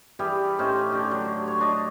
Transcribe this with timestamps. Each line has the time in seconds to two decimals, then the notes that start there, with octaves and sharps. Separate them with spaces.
0.19 E3 G3 G4 G#4
0.59 A2 C#4 D#4 C5
0.92 D3 D4 G4
1.11 F#3
1.48 C#5 C6
1.60 D4 D#5